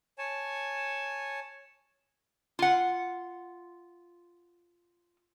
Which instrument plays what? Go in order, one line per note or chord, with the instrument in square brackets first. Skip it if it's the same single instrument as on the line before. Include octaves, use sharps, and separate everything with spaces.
[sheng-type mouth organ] C#5 G#5 A5
[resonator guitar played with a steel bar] F4 F#5